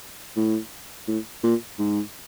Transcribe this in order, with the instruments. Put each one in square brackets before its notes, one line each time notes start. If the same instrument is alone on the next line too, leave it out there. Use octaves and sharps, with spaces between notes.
[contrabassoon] A2
A2
A#2
G#2